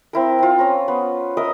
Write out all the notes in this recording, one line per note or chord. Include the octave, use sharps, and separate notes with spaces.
C4 E4 A#4
C4 F4
C#4 A#5
B3
A#4 D#5 E5 D#6